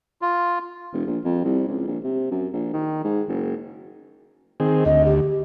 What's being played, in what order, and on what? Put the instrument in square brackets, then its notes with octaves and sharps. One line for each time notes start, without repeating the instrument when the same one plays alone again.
[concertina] F4
[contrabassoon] E1
A#1
F2
C2
C#2
A#1
C3
F#2
A#1
D#3
G#2
F#1
[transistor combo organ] D#3 C4 G#4
[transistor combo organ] D2 [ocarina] D#5
[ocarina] G4